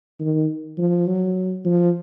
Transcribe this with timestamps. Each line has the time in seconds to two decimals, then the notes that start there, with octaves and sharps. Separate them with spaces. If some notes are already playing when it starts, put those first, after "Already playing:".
0.20 D#3
0.78 F3
1.07 F#3
1.65 F3